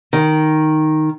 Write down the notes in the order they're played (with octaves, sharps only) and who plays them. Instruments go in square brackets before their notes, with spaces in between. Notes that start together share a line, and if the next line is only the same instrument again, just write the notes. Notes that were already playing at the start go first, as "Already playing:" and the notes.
[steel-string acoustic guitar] D#3